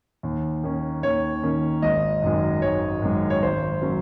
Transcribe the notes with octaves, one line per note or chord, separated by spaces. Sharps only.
D#2
D#3 A#3 C#4
D#2 C#5
D#3 A#3 C#4
G#1 D#5
F#2 D#3 G#3
G#1 C#5
F#2 D#3 G#3
C#5
G#1 C5
F#3 A#3 C#4